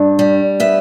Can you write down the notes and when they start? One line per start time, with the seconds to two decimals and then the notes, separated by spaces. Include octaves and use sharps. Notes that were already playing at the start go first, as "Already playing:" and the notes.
Already playing: G2 D4
0.19 G3
0.60 B3 E5